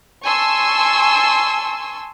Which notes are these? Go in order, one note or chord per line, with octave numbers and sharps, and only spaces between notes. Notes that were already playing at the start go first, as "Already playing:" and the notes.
G#5 A5 C6 C#6 E6